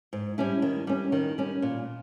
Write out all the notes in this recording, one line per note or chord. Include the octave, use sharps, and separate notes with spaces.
G#2
G3 C#4 E4
D#3
G3 C#4
D#3
G3 C#4
A#2